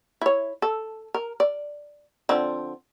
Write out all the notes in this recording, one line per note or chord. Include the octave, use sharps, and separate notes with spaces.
E4 C#5
A4
A#4
D5
D3 F3 C4